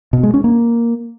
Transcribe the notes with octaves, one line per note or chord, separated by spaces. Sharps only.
B2
G#3
C#4
A#3